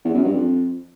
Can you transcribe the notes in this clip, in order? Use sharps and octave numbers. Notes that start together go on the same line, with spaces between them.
E2
F#2
G2
F2